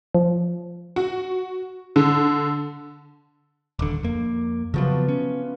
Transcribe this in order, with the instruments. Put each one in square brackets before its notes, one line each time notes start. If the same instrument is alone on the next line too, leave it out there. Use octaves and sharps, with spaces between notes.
[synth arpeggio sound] F3
[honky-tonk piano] F#4
D3
[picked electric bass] D#1 D3 [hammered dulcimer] D5
[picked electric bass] F2 A#3
[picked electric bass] C#3 F3 F#3 [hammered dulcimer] A3 B3 F4
[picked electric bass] C#4